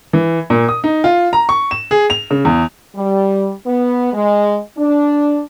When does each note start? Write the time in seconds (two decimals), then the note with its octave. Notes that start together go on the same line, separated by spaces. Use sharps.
0.13 E3
0.50 A#2
0.69 D#6
0.84 D#4
1.04 F4
1.33 A#5
1.49 C#6
1.71 E7
1.91 G#4
2.10 F7
2.31 C#3
2.45 E2
2.95 G3
3.67 B3
4.13 G#3
4.78 D4